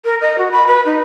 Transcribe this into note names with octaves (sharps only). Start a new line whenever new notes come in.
A#4
D#5
F#4
B5
B4
D#4